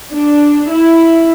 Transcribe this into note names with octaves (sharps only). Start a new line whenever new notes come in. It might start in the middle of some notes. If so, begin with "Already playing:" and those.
D4
E4